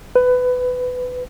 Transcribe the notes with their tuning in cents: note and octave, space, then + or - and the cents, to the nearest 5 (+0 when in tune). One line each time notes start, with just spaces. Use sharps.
B4 +20